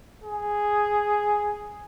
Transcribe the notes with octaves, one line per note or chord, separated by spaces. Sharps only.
G#4